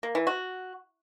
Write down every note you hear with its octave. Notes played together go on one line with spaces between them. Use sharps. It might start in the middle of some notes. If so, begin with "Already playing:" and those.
A#3
E3
F#4